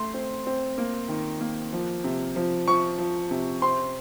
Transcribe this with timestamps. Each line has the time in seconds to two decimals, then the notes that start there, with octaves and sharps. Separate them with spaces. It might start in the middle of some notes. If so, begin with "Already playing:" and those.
Already playing: A3 C6
0.14 C4
0.47 C4
0.78 A#3
1.09 D#3
1.41 A#3
1.73 F3
2.04 C3
2.36 F3
2.67 F3 C#6
2.98 F3
3.31 C3
3.62 C4 C6